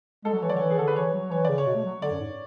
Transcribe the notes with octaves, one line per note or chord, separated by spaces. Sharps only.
G#3 A4
F#3
E3 C#5
F#3 D5
D3 E3 C#5
G#4
D3 A4
B4
E3 C#5
F#3
E3 C#5
C#3 D5
C#5
B2
A3
F#3
D3 D5
F#2
G#2